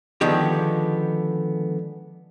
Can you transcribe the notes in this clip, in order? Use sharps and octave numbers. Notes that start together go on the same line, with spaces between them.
D3 D#3 F3 G#3 B3 G4